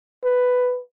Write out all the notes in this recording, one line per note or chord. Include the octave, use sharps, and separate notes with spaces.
B4